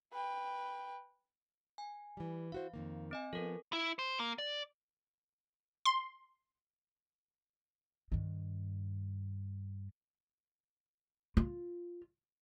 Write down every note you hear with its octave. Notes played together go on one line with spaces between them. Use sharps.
B4 G5
G#5
E3 G3
E4 F#4 C5 F5
F2 D#3 A#3
C4 D#5 G#5
F3 B3 A4 A#4
E4
C5
A#3
D5
C6
G2 D#3
F4